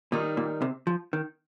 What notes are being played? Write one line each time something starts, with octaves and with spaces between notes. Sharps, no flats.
A#2 D#3 G3 D#4
A#2
C3
F3
D#3